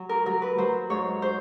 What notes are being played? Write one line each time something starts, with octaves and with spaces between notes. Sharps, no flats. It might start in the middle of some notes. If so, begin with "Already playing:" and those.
Already playing: F#3
A#4
F#3 A#4
B4
F#3 C5
G#2 C#5
C5